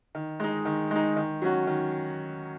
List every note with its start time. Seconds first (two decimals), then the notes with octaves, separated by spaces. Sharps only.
0.15 D#3
0.40 G#3 D#4
0.65 D#3
0.91 G#3 D#4
1.16 D#3
1.42 F#3 C#4 F#4
1.67 D#3